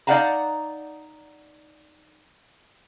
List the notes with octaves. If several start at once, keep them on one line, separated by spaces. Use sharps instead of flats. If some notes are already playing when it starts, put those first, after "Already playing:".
D#4 D5 F5 F#5 A5 A#5